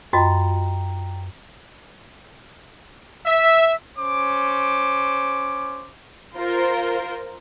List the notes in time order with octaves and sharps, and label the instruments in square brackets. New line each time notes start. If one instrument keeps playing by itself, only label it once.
[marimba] F#2 [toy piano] F4 F#4 D#5 [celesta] G5 A#5
[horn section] E5
[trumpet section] C#4 C5 D6
[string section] F4 A#4 C5